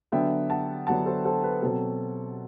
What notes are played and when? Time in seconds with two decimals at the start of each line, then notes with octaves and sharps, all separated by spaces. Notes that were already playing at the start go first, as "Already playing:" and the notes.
0.12 D3 F#3 B3 D4 E5 G5
0.50 F#5 A5
0.87 D3 F#3 B3 D4 F#5 A5
1.06 A4 C5
1.25 A4 C5
1.44 B4
1.62 B2 F#3 C4 A4